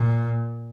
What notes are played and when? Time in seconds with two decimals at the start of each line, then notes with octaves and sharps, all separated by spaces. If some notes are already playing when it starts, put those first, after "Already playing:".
Already playing: A#2